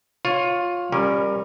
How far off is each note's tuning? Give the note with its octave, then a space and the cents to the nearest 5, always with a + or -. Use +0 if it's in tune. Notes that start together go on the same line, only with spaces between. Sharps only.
F4 +15 C#5 +0
G3 +20 C#4 -15 A#4 +0